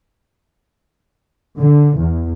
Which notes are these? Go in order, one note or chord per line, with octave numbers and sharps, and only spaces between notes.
D3
E2